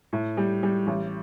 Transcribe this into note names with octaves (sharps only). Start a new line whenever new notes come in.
A2
G3
G3
A1